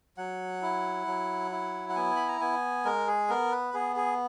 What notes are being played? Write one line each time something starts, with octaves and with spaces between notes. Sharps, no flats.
F#3 F#5
E4
F#3
E4
F#5
B3 G#5
B5
A#5
B3 G#5
G#3 A#4
G#4
B3 A#4
B4
B3 G#4
G#4